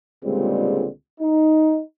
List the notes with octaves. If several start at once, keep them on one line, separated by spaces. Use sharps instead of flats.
C#2 A#2 D3 G3 G#3 C4
D#4